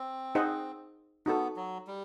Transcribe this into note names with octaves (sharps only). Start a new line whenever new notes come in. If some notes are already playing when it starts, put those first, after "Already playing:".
Already playing: C4
D#4 G#4 C5 D#5 F#5
B3 D#4 F#4 A4
F#3
G3